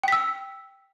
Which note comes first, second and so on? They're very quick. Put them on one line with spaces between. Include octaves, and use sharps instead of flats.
G5 B6 E6